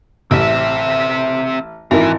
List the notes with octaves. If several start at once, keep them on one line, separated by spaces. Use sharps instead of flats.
A1 C4 E5
G#1 E3 E4 A#4